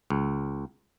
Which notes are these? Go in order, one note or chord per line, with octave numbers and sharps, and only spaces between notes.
C#2